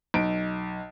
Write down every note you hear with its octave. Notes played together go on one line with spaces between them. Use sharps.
B1 D7